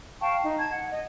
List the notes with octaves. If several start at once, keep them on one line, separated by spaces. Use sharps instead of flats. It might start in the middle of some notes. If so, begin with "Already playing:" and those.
F5 G5 A5 C#6
D#4
A5 G#6
F#5
D#5